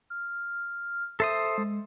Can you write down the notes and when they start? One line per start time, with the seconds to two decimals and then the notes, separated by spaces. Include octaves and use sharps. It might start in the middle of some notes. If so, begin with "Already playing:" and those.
0.10 F6
1.20 A4 C5 E5 D#6
1.58 G#3